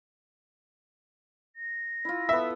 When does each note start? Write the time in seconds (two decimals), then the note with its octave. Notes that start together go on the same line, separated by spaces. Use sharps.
1.56 A#6
2.05 E4 F4
2.29 B3 A4 E5